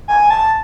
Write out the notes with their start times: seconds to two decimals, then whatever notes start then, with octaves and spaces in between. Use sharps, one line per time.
0.08 G#5
0.30 A5